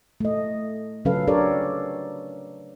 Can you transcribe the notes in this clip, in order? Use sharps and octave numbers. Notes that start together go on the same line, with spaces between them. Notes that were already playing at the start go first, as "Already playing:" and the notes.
A3 D#5
C#3 F#3 C#4 A4 B4 F5
D4 G4 A4 A#4 C#5 D5